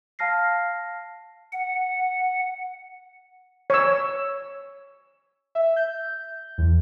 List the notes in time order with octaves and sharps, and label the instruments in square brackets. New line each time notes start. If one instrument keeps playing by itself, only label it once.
[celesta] F5 A5 F6 A#6 C7
[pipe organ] F#5
[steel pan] C#5 E6
[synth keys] E5
G6
E2